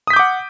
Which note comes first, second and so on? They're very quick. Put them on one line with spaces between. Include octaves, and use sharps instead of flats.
D#6 B6 G6 D6 F#5